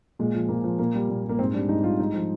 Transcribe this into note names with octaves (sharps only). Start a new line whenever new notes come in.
A#2 G#3
F3
A#2 A#3
F3
A#2 A#3
G3
A#2
G3
A#3
G#2 C4
G3 D4
G#2 D#4
G3 F4
G#2 D#4
F3